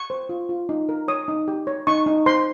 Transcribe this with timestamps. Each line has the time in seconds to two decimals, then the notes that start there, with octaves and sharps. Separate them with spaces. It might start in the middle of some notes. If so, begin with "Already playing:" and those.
Already playing: C#6
0.10 C5
0.29 F4
0.49 F4
0.69 D#4
0.89 A#4
1.08 C#5 D#6
1.28 D#4
1.48 G4
1.67 C#5
1.87 D#4 C#6
2.06 D#4
2.26 C5 C6